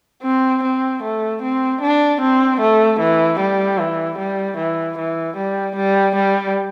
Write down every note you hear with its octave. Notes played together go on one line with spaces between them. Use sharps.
C4
C4
A3
C4
D4
C4
A3
E3
G3
E3
G3
E3
E3
G3
G3
G3